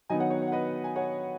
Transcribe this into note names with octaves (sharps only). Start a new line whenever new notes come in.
D#3 F#3 B3 D#4 D#5 G#5
C#5 F#5
C#5
C#5
F#5
B4 D#5
G#5
C#5 F#5